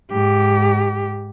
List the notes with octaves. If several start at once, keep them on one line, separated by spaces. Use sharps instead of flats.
G#2 G4